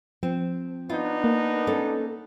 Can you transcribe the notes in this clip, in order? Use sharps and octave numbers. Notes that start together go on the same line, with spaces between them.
F3 C4
B3 D4 D#4 F4
A#3
A3 C#4 A4